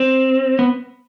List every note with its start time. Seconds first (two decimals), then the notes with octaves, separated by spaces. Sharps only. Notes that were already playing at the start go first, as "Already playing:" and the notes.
Already playing: C4
0.59 B3